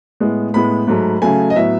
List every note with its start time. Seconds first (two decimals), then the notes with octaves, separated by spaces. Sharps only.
0.20 A2 G#3 B3
0.54 A2 G#3 B3 B5
0.87 G#2 F#3 A3
1.22 C#3 F#3 A3 G#5
1.50 D#5
1.55 A2 F#3 B3 E5